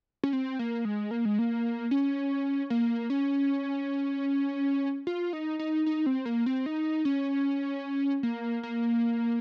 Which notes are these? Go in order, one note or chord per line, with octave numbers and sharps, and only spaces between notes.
C#4
C4
A#3
G#3
A#3
G#3
A#3
C#4
A#3
C#4
F4
D#4
D#4
D#4
C4
A#3
C4
D#4
C#4
A#3
A#3